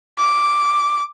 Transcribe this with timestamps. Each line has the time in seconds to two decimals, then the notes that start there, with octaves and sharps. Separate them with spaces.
0.18 D6